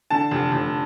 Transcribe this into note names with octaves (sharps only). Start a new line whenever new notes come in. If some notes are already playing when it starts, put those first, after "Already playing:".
D3 A5
F1
F1